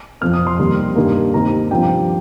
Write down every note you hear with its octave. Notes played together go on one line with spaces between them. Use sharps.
F2 F3 C4 F6
D#6
C6
D#2 D#3 G3 C4
G2 D#3 A#3
D#2 D#3 C4 A#5
G2 F3 C4 G5